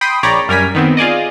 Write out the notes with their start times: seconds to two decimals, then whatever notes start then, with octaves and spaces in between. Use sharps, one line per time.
0.01 G5 B5 C6 D#6
0.23 A#1 C#5 D5 G5 A#5 B5
0.48 F#2 G3 A#4 G#5 B6
0.75 D#3 B3 C4
0.97 F4 G#4 D5 D#5